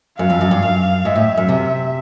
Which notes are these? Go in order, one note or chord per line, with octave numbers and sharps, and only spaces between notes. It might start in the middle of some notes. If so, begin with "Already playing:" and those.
F#2 F5
F2
F#2
G2
F#2
G#2 E5
A2
F#2
C3